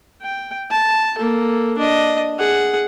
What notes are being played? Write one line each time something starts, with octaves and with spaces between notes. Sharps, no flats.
G5
A5
A#3 A4
D4 D#5
G#4 F#5